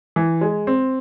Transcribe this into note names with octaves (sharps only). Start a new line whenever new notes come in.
E3
G#3
C4